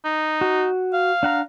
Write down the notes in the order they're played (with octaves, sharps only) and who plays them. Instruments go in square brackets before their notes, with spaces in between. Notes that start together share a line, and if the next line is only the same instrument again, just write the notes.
[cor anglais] D#4
[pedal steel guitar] F#4
[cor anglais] F5
[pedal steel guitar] D4 F#5 A#5